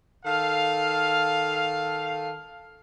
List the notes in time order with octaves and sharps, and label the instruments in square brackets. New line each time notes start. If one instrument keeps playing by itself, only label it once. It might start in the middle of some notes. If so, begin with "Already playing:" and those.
[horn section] D#3 A4 F5